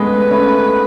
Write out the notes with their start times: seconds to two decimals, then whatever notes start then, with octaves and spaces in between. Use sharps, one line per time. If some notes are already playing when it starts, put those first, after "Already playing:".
Already playing: G#3 A3 B3 C#4 B4
0.31 A3 C#4